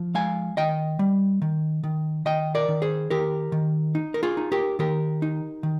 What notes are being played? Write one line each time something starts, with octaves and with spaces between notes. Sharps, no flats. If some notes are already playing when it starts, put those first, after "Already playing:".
Already playing: F3
G#3 F5 G#5
D#3 D#5 G5
G3
D#3
D#3
D#3 D#5 G5
A#4 D5
D#3
G#4 C5
D#3 G4 A#4
D#3
D#4
A#4
F4 G#4
D#4
G4 A#4
D#3 G4 A#4
D#4
D#3